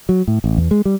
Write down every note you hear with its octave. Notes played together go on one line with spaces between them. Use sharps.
F#3
A2
A1
E2
G#3
G3